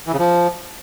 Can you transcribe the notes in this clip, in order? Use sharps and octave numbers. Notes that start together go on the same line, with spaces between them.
E3
C#3
F3